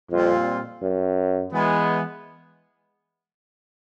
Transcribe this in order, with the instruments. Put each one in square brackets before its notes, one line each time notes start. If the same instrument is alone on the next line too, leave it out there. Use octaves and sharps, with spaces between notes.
[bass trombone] F2 [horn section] A#2 G3 C4 F4
[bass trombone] F#2
[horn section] E3 G#3 B3